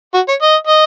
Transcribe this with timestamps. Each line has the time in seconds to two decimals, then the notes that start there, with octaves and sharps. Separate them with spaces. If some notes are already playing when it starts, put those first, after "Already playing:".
0.14 F#4
0.29 C#5
0.42 D#5
0.67 D#5